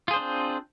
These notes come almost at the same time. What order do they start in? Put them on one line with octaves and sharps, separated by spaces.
F4 G#4 C5 D4 C4